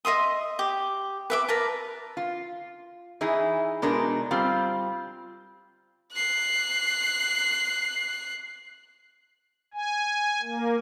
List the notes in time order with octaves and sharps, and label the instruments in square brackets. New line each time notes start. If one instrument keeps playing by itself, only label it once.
[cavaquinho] D#5 E5 C6 D#6
G4
B4 E5 D6
A#4 B4 A5
[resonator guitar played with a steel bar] F4
E3 D#4 E4 G#4
B2 G#3 D4 D#4 A#4
G3 C4 F4 G4
[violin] F#6 C7
[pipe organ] G#5
A#3